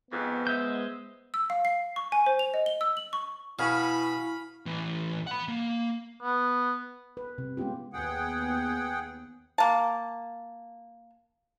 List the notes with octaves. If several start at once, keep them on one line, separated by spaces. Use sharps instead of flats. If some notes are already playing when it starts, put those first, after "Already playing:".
F2 G#2 B3
G#3 C5 D#5 E5 G6
E6
F5
C7
C#6
G#5
C5
F7
D#5
G7
E6
F#7
C#6
B2 E4 F5 G#5 B5 C#6
A2 E3
F#5 B5
A#3
B3
B4
C3
G#3 B3 C#4 F4 G4
D#2 B3 G#4 F#5 G5
A#3 A5